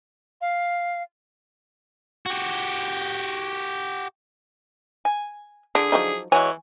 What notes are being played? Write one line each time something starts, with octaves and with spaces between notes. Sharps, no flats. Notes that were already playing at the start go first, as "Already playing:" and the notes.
F5
F#4 G4
G#5
D3 D4 G#4
F3 F#3 D#4
E3 G#3 F#4 C#5 G#5